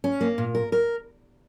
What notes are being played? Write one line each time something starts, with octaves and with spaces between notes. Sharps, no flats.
C#4
A#3
A#2
A#4
A#4